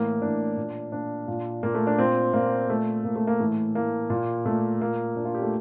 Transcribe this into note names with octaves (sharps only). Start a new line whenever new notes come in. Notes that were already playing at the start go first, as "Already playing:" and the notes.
Already playing: A2 E3 A#3
A2 E3 D4
A#2
A#2 D4
A#2
A#2 A#3
A3
D4
A#2 C4
A#2 A#3
A#2 A3
A#2 A#3
A3
A#3
A2 E3 A3
A2 E3 A#3
A#2
A#2 A3
A#2 A#3
A#2 D4
F4
G4
A3